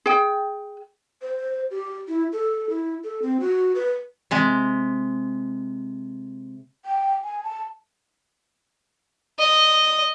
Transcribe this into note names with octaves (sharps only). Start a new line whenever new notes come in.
G#4 G5
C5
G4
E4
A4
E4
A4
C4
F#4
B4
C3 G#3
G5
G#5
A5
D#5